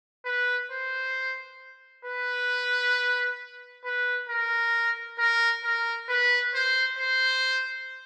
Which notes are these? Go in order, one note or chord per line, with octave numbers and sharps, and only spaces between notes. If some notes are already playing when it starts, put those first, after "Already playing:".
B4
C5
B4
B4
A#4
A#4
A#4
B4
C5
C5